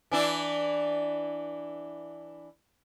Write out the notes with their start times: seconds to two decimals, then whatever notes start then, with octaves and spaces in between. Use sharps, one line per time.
0.11 E3 D4 E4